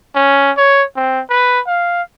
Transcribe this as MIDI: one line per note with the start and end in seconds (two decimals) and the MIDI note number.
0.15 0.51 61
0.57 0.83 73
0.96 1.21 60
1.30 1.60 71
1.67 2.02 77